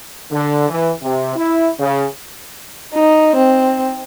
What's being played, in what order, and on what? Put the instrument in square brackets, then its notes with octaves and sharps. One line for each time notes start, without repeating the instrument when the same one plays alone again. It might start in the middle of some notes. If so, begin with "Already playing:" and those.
[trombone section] D3
E3
C3
E4
C#3
[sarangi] D#4
C4